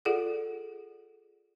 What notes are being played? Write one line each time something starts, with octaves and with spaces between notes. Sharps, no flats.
F4 G#4 A4 D5 F#5